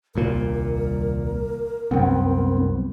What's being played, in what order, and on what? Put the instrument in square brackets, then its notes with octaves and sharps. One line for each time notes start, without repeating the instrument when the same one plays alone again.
[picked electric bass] D#1 C2 A#2 [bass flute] A#4
[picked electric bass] C2 F#2 [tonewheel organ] B3 C4